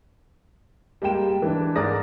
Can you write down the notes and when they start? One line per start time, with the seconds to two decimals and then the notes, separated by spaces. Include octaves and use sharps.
1.02 G3 G#3 A#3 G5 E7
1.42 E3 D4
1.76 G#2 G#3 A#4 D5 D#6 A#6